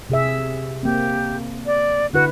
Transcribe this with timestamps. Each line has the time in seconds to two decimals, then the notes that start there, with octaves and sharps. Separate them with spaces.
0.10 C3 G#4 E5
0.83 A#3 C4 G4
1.66 D5
2.13 D3 E4 F#4 B4